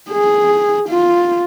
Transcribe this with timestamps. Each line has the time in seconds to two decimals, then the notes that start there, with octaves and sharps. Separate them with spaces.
0.10 G#4
0.89 F4